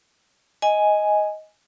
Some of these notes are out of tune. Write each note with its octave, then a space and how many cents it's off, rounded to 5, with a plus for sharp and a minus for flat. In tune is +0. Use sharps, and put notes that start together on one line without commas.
D#5 +10 G#5 +0